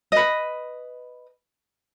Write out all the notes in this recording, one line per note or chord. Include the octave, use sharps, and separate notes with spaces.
B4 D#5